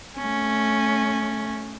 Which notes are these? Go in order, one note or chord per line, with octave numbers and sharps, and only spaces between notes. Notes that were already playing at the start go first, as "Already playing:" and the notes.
A3 C#4